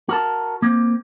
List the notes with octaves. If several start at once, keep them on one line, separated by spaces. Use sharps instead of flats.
F#4 A#4 A5
A#3 C4